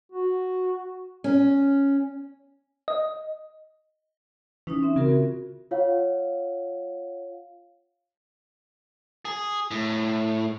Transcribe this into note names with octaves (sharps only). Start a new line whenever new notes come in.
F#4
C#4
D#5
E3 C#4 D#4 D#6
C4 E5
C#3 F4 F#4 A#4
C#3
F4 C#5 F5 F#5
G#4
A2